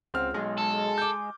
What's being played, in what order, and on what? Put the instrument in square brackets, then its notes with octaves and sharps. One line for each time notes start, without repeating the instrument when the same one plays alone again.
[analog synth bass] C#2 [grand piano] C4 F#5 F6
[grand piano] B1 [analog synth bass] G#3
[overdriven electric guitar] A4
[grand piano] D6 G6